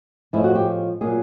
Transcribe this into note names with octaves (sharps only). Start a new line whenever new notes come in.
A2 F3 G#3 E4
F#4
G4
A#2 F#3 G#4